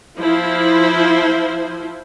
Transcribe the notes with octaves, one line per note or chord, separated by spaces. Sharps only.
F3 E4 C5